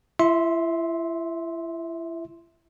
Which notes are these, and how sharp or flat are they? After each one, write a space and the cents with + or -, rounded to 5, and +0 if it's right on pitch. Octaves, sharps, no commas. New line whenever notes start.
E4 +35 E5 -15 C6 +0